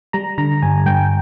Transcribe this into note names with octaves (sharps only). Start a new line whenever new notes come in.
G3 A#5
D3 A#5
G2 G#5
G2 G5